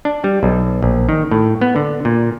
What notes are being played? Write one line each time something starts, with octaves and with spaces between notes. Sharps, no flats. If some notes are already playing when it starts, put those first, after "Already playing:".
D4
G3
B1
A#1
D#3
A2
B3
D3
A#2